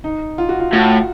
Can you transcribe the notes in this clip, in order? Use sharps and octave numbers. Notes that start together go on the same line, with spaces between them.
D#4
F4
F#4
F4
A2 F#4